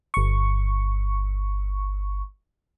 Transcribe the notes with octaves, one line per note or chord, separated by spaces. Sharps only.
G1 C#6